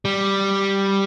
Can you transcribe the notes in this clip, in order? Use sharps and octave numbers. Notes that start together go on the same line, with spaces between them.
G3